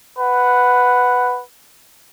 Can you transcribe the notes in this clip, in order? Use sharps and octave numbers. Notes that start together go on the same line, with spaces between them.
B4 F#5